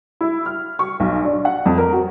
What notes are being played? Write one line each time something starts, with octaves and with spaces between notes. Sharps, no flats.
E4
F6
C#6
B1
D4
F#5
F2
A#4
F#4